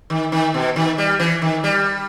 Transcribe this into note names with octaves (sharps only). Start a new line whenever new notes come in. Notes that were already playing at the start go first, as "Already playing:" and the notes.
D#3
D#3
B2
D#3
G3
E3
D#3
G3